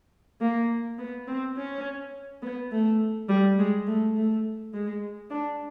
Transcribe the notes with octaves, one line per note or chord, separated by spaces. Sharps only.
A#3
B3
C4
C#4
B3
A3
G3
G#3
A3
A3
G#3
D4